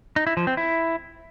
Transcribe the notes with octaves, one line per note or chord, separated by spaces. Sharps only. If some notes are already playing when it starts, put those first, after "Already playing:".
D#4
E4
F3
C4
E4